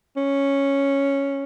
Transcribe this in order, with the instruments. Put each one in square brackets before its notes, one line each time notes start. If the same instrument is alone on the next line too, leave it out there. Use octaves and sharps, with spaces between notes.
[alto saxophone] C#4